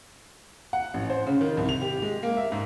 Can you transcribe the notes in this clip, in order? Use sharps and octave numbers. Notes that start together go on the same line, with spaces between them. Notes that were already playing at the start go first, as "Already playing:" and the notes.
F#5
A1
C5
C#3
D#3
C2
F7
G4
G#3
A#3
E5
G#2